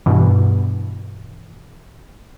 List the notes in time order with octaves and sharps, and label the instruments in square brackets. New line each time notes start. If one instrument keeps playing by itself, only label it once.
[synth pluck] G2 B2 E3